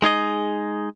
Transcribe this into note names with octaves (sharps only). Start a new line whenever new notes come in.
G#3 D#4 G#4 D#5